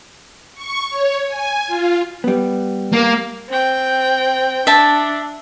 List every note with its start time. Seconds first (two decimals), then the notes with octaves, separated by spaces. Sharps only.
0.55 C#6
0.90 C#5
1.28 G#5
1.67 F4
2.24 G3 B3
2.93 A#3
3.49 C4 G5
4.67 D4 E5 A5